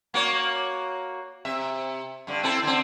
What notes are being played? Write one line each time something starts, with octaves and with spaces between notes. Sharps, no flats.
A#3 F#4 C#5
C3 E5
G2 D3
C4 E4 A4
D3 C4